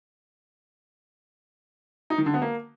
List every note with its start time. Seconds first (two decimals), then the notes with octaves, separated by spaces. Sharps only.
2.10 D#4
2.18 D#3
2.26 D3
2.34 B3
2.42 A#3